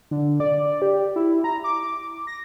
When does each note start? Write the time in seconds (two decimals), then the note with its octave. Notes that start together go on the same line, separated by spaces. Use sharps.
0.11 D3
0.40 D5
0.82 G4
1.16 E4
1.44 A#5
1.64 D6
2.27 A#6